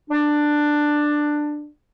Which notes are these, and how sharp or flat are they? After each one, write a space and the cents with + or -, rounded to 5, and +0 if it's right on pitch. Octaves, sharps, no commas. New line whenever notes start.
D4 +10